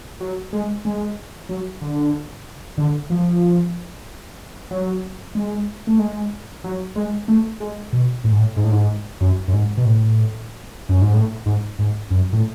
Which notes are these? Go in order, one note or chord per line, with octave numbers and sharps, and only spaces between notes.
F#3
G#3
G#3
F#3
D3
D3
F3
F#3
G#3
A3
G#3
F#3
G#3
A3
G#3
B2
A2
G#2
A2
G#2
A2
G#2
F#2
F#2
G#2
B2
A2
F#2
G#2
A2
G#2
G#2
F#2
A2